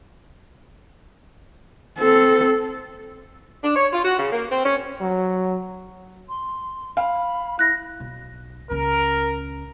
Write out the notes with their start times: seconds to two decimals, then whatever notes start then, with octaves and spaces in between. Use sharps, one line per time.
1.99 C4 A4
3.63 D4
3.76 C#5
3.93 F4
4.04 F#4
4.19 C#3
4.32 A#3
4.51 C4
4.65 C#4
5.01 F#3
6.29 C6
6.97 F5 B5
7.59 E4 F#6 A#6
8.00 B1
8.70 C#2 C#4 A#4